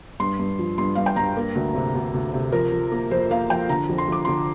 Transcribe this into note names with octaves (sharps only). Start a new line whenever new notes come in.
G2 C6
G2
F3
G2 C6
G2 F5
G5
G2 A#5
A#3
D2
C3
D2
D2
C3
F3 A#4
F3
A#3
F2 C5
A#3 F5
F3 G5
D3 A#5
F2
C6
F2 D6
D3 C6